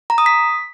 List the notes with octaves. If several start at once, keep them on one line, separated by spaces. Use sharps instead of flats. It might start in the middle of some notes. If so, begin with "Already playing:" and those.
A#5
D#6
B6